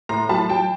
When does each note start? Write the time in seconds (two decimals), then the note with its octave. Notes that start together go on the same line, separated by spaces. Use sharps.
0.09 A2 A#5 C6
0.29 F#3 A5 B5
0.49 F#3 G5 A5